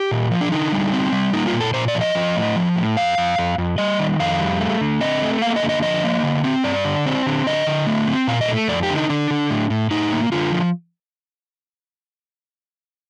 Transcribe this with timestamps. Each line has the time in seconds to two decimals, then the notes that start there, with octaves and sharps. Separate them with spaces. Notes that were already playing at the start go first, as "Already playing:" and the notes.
Already playing: G4
0.11 A#2
0.31 F3
0.41 D4
0.51 D3 D#4
0.72 G3
0.93 C4
1.12 G3
1.33 A#3 D#4
1.47 F4
1.54 A#2
1.60 A4
1.74 A#2 C5
1.88 D5
1.95 F3
2.01 D#5
2.15 F3
2.36 A2
2.56 F3
2.76 A2
2.96 F2 F5
3.18 F2
3.38 F2
3.58 F2
3.78 G3 D#5
3.99 D#3
4.20 F2 F5
4.40 G3
4.60 A3
4.81 D3
5.01 C4 D#5
5.22 A3
5.42 A#3 F5
5.56 D#5
5.62 D3
5.69 D#5
5.83 F3 D#5
6.04 A#3
6.23 D3
6.44 C4
6.64 G2 D5
6.85 D3
7.06 C4
7.26 D3
7.46 D3 D#5
7.67 D3
7.87 A3
8.07 C4
8.27 A#2 F5
8.41 D#5
8.48 A3
8.68 F2 D5
8.83 G4
8.90 D3
8.96 D#4
9.09 D3 D4
9.30 D3
9.50 A2
9.70 A2
9.91 A2 D#4
10.12 A#3
10.32 D3 F4
10.52 F3